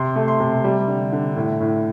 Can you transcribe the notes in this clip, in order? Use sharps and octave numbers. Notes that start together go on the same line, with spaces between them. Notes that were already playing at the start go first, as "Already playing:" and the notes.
Already playing: C3 C6
A3
C6
C3
G3
D3
D3
A2
A2